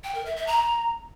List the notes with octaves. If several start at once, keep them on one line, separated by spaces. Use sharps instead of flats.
G5
A#4
E5
E5
A#5